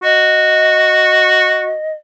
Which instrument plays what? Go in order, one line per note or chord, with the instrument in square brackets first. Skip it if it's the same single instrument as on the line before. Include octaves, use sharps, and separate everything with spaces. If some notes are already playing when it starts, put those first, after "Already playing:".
[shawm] F#4 [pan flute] D#5